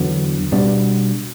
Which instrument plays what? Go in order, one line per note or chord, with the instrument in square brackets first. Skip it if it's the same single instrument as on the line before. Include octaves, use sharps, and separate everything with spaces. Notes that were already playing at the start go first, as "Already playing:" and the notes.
Already playing: [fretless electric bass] E2 D3 F#3 B3
B2 G3 B3 D4